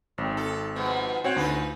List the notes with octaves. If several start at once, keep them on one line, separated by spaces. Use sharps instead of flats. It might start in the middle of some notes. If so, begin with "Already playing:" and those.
G#1 F2
A4
G#2 B2 F3
C4 F#4 C#5 F#5
D2 D#4 F4 B4